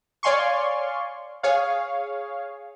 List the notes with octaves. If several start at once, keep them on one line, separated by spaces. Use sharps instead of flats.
C#5 D5 F5 G#5 C6 C#6
G#4 C#5 F5